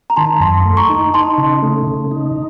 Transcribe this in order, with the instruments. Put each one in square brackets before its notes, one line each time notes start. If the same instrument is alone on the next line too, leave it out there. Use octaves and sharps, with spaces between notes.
[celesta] A#5
[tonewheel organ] D#3 [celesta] A5 C6
[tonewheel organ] F#2 [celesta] A5 C6
[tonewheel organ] A3
[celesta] A#5 C#6
[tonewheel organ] D#4
[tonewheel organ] D#4 [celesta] A5 C6
[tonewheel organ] C#3
A3
C#3
D#4